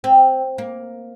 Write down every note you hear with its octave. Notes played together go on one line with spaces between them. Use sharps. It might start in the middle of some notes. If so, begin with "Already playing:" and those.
C4
A#3